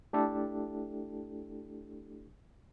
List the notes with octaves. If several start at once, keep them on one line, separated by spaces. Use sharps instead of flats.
A3 D4 E4 G4 A4